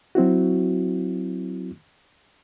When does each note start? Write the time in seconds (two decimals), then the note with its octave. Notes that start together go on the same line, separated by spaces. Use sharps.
0.15 F#3 C4 E4 F#4